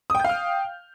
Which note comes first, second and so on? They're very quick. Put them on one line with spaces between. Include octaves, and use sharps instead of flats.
D#6 G5 G6 F5 F6